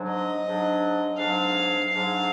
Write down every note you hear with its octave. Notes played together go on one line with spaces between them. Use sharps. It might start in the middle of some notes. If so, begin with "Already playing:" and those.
Already playing: G#2 F#3 D4
D#5
G#2 F#3 D4
G#2 F#3 D4 F5
G#2 F#3 D4 F5